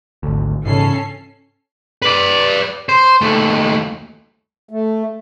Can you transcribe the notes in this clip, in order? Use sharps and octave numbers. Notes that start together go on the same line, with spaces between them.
G#1 D2
G#2 C#3 E3 C#4 A4 C7
B4 D5
C5
D#2 A3
A3